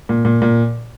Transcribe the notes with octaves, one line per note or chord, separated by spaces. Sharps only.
A#2
A#2
A#2